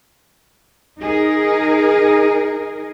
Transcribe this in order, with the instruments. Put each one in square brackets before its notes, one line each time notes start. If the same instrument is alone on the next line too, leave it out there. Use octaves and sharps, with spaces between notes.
[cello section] D#4 G#4 A#4